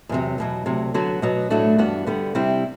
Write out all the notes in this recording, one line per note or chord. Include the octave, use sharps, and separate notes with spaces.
E2 C3 F#3
E2 B2 F#3
D2 C3 F#3
D3 F#3 B3 F#4
B2 F#3 B3
A2 F#3 A3 D4 F#4
G2 E3 B3 D4 F#4
D3 G3 B3
C3 G3 C4 E4